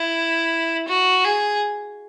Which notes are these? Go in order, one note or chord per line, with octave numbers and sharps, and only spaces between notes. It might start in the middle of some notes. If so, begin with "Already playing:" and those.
Already playing: E4
F#4
G#4